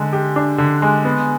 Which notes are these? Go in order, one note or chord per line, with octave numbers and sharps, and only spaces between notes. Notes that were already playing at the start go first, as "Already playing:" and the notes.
Already playing: D3 G#3
G4
D4
D3
G#3
B3